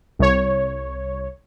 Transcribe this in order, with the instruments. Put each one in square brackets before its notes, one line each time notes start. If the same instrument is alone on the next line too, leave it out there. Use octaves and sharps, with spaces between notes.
[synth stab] C2 C#5